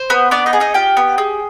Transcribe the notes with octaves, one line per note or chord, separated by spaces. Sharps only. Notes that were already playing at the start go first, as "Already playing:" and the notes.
Already playing: C5
B3
B3 D4 D5
D#4 D#5
G#4
D#4 D#5
F4 G4 G5
B3
G#4